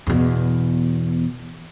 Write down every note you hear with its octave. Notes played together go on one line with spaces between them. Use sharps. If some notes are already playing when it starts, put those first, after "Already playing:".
E2 B2